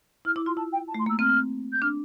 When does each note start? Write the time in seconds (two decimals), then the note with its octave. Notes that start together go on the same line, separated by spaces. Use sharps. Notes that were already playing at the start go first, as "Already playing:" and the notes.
0.25 E4 F6
0.36 E4 D6
0.46 F4 C6
0.57 E4 A5
0.72 G5
0.88 A5
0.94 A3 C6
1.06 A#3 E6
1.19 C4 F6
1.72 G6
1.82 D4 F6